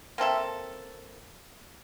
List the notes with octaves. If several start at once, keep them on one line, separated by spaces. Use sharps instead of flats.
A#3 C4 A4 E5